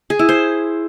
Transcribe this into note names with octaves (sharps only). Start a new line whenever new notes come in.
G#4
E4
C5